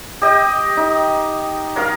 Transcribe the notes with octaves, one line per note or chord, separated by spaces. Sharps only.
G4 D#5 G5
D#4
F#3 A#4 F5